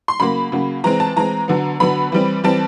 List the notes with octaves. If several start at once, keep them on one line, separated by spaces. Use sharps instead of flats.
C6
C#3 F#3 A#3 B5
C#3 F#3 A#3
E3 G#3 C4 A#5
A5
E3 G#3 C4 A#5
D3 F#3 B3
D3 F#3 B3 B5
E3 G3 C4
E3 G3 C4 A5